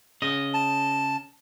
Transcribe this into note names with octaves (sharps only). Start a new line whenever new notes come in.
C#3 D#5
A5